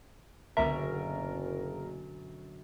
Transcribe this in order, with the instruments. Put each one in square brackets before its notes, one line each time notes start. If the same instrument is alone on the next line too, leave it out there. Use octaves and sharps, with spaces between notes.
[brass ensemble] F#1 [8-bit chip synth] C#2 E5 [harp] F#2 B2 D3 [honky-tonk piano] A#4